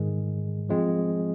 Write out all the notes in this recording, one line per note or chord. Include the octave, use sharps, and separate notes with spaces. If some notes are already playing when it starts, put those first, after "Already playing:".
Already playing: G#2 D#3 G#3
F3 G#3 C4 F4